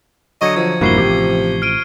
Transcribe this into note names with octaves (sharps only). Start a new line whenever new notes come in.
D3 F#3 D#5 C#6 G#6 C#7
F3
E1 G2 A#3 E4 F#4 G#6 C7 G7
A1 C3 G4
F6 D7 D#7